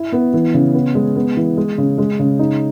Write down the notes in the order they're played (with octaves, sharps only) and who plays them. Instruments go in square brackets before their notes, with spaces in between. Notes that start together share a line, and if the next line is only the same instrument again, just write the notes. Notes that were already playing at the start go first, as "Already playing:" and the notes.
Already playing: [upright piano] E4
B3
E3
C#3
B3
G#3
B3
E3
G#3
C#3
G#3
C#3
D#4